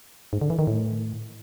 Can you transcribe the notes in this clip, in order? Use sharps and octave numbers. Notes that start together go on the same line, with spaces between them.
G#2
D3
E3
D#3
A2